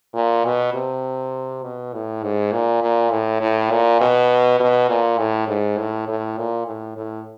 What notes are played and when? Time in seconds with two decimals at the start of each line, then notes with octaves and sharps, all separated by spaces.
0.15 A#2
0.45 B2
0.74 C3
1.63 B2
1.93 A2
2.23 G#2
2.52 A#2
2.82 A#2
3.11 A2
3.41 A2
3.71 A#2
4.01 B2
4.60 B2
4.89 A#2
5.18 A2
5.48 G#2
5.78 A2
6.08 A2
6.38 A#2
6.67 A2
6.97 A2